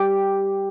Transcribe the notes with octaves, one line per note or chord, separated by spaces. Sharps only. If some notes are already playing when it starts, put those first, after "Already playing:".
Already playing: G4